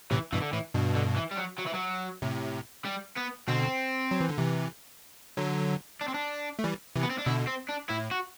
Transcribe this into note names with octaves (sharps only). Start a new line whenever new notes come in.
A2 C3 E3
G2 B2 E3
D3
A2 E3
G2 B2
D3
E3
G3
F#3
F#3
E3
F#3
A2 C3
G3
B3
B2 D3 C4
F#3
E3
D3
C3 E3
D3 F#3
D4
C4
D4
A3
E3 G3
C3 E3
B3
C4
D4
B2 D3 E4
C4
D4
A2 E4
F#4